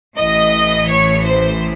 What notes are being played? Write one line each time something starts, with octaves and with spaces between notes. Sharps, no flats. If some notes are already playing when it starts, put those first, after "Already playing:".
A1 A2 E3 D#5
C#5
C5